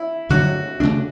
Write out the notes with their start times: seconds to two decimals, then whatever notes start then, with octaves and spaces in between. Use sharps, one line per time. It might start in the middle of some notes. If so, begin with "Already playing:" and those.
Already playing: E4
0.29 G2 D3 F#3 F#4
0.80 C#3 E3 A3 D4